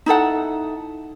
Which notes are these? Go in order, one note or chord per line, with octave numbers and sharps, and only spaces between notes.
D#4 E4 A4 F#5